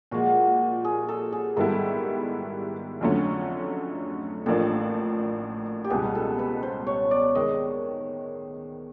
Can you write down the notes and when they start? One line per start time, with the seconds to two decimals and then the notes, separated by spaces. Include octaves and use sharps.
0.11 A#2 F3 G#3 F#4
0.84 G#4
1.08 A4
1.32 G#4
1.57 G#2 D#3 G3 B3 E4 A4
3.01 F2 D3 F#3 A3 C#4
4.46 A1 A2 F3 A#3 D4 A4
5.84 G4
5.90 C#2 B2 G3 B3 G#4
6.15 A4
6.39 B4
6.63 C5
6.87 C#5
7.11 D5
7.35 D#3 G#3 D#5